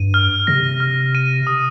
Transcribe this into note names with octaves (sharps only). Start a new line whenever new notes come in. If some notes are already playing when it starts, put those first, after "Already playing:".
Already playing: G2 D#7
F6
C3 A#6
F6
D#7
D#6